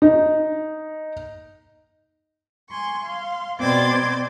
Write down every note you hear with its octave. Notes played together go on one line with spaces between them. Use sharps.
D#4
G#5 C6 C#6
F5 C6
B2 C4 D5 C6 D6 G#6